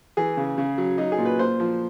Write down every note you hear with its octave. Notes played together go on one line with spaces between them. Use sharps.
E3 G#4
C#3
C#3
F#3
F#3 D#4
G#4
A#2
B4
A#2 C5
F3